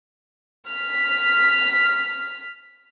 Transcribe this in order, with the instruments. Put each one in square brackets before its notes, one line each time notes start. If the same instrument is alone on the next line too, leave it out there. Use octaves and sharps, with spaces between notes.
[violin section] F6 B6